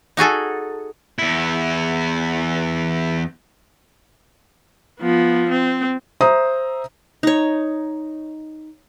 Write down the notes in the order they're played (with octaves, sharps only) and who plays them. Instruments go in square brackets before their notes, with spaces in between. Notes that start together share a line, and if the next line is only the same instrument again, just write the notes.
[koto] D#4 F#4 G#4 A4
[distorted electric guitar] E2 E4
[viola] F3 B3
C4
[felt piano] C5 E5 A#5 D#6
[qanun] D#4 C#5